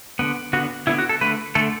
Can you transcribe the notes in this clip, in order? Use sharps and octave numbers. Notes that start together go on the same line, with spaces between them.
D3 B3
D3 B3 F#4
D3 B3 E4
F#4
A4
D3 A3 B4
D3 A3 A4